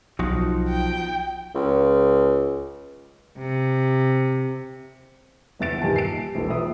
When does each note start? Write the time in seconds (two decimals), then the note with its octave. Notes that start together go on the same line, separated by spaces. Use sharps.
0.19 B1 F3 D#4 F#4
0.69 G5
1.55 C#2
3.38 C3
5.59 G1 E2 E5 A6 D7
5.82 A#2 D#3 G3 G4 G#5 A5
5.96 C7 D7
6.35 E1 A#1 A#2 E3 A4
6.50 B4 E5 D#6